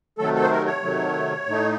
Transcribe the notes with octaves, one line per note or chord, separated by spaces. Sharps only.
C3 D#3 F#3 A3 A4
A4
C5
A#4
C#5
C3 D#3 F#3 A3
A2 A3 D#4